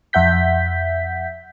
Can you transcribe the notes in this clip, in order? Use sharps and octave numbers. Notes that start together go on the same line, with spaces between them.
F2 E5 F#5 G6 B6